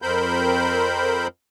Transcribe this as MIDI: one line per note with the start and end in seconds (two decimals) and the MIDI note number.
0.02 1.27 41
0.02 1.27 60
0.02 1.27 70
0.02 1.27 72
0.02 1.27 83
0.02 1.27 91